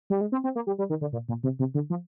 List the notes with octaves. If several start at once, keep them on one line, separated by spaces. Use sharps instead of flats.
G3
G#3
C4
C4
A#3
G3
G3
D#3
D3
A#2
A#2
C3
C3
D3
F3